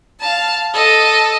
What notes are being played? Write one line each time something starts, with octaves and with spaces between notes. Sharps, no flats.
F5 A5
A4 D#5